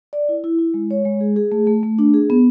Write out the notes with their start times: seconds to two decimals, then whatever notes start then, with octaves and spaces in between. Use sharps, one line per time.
0.13 D5
0.29 E4
0.44 E4
0.59 E4
0.74 G#3
0.91 C#5
1.05 G#3
1.21 G#4
1.36 G#4
1.52 A3
1.67 A3
1.83 A3
1.98 D4
2.14 G#4
2.30 B3